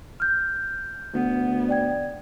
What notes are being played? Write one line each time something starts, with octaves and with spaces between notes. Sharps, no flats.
F6 G6
D2 B3
D5 G5 G#6